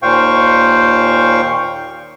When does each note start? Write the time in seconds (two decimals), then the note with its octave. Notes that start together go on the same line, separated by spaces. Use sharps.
0.02 D#2 A#2 C5 F5 G5 C#6